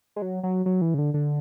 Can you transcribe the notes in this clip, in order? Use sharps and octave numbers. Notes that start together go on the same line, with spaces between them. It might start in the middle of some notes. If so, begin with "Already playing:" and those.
G#3
F#3
F#3
F#3
E3
C#3
D3
D3